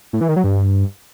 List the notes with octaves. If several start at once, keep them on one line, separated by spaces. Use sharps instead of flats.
A2
E3
D#3
F#3
G2